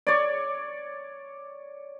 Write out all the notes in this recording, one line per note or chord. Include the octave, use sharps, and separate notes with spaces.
C#5 D5